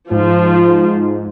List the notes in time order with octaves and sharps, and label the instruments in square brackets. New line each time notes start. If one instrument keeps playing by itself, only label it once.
[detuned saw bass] G#2 [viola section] F3